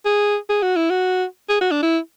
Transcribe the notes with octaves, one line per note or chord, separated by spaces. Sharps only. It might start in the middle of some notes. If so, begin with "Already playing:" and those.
G#4
G#4
F#4
E4
F#4
G#4
F#4
D4
E4